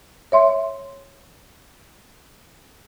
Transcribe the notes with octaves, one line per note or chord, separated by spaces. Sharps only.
C#5 E5 C6